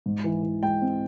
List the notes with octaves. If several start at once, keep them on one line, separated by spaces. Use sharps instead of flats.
G#2
E3
E3
G#3 G5
C4